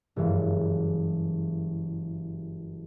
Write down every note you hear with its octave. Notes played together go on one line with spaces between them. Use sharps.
F#1 G2 E3 G#3